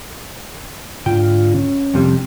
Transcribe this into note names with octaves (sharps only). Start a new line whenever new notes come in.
G#2 D3 F4 G5
C#4
F2 C3 G3